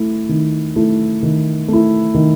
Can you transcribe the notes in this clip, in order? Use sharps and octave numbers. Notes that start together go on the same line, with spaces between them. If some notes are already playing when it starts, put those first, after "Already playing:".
Already playing: A3 E4
D#3
A3 E4
D#3
A3 E4
D#3